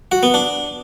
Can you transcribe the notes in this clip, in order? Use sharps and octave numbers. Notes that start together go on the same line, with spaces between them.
F#4
B3
D4